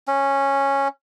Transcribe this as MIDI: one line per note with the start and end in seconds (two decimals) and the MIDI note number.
0.08 0.88 61